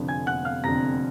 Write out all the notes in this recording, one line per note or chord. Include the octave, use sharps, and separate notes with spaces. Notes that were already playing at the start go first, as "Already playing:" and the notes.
Already playing: F1 F2 D3
G#5 G#6
F#5 F#6
F5 F6
F1 F2 D3 A#5 A#6